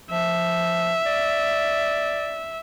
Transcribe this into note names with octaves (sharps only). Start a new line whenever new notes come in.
F3 E5
D5